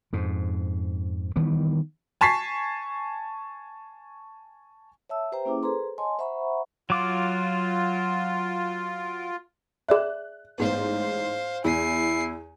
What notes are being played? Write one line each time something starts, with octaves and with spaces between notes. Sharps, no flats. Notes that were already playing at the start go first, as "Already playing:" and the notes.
F2 G#2
D#3 E3 G3 B3
G#5 A5 C#6 B6 C7
C#5 E5 A5 E6
G4 B4 C5 E5 G5 A#5
A#3 C#4 E4 G#4 D6
G#4 A4 B4 C5 A#5 C6
C#5 D#5 G#5 A5 C6
C5 E5 F#5 A#5 B5 C#6
F#3 F4 D6
G#4 D5 E5 F#6
A1 G#2 B3 C5 F5
E2 E4 G#5 C7